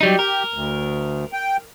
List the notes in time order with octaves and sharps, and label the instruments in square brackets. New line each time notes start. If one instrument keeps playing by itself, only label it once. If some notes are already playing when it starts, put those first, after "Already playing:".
[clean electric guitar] F#3 G3 D#4 [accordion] G4
[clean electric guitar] A#4
[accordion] D2
G5